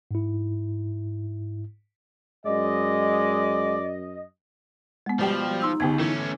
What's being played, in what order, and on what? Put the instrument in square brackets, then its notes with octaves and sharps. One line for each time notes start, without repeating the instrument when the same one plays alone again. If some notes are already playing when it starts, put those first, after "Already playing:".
[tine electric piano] G#2 E4
[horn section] F#2 D#5 [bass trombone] G#3 [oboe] D5
[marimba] G#3 B3
[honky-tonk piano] B2 G3 G4 [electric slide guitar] F3
[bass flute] D#4 [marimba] C6 E6
[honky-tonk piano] C#2 G4 [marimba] D3 B3 G#6
[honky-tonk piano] E3 [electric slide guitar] A3 C#4